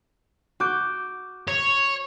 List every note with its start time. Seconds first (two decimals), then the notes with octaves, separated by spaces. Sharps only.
0.60 F#4 D6 G6
1.48 C#5